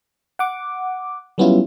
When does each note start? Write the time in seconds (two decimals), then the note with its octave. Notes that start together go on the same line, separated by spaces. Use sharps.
0.39 F#5 D6
1.38 F#3 G3 B3 C#4 E4 F4